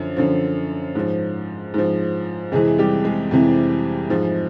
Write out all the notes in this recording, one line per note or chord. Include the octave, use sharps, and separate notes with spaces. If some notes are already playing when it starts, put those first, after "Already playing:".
Already playing: F#2 D3 F3
F#2 D3 F3
G#2 F3
G#2 F3
F2 C3 E3 G#3 G#4
G3 G4
G#3 G#4
F2 C3 E3
G#2 F3